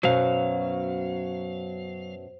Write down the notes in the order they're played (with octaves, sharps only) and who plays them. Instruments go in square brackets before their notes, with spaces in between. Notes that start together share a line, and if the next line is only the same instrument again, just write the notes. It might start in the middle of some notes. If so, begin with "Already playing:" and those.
[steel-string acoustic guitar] F#2 B2 [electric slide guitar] F#3 F5 [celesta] C5